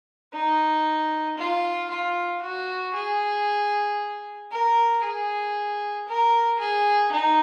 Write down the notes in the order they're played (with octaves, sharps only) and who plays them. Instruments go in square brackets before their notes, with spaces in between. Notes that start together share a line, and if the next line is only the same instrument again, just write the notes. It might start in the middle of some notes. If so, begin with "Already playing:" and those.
[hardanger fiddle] D#4
F4
F4
F#4
G#4
A#4
G#4
A#4
G#4
D#4